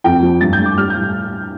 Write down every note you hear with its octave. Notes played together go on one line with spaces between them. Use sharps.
F2 G5
F3
G2 A6
G6
G2
D6
G3 F6
G6
A2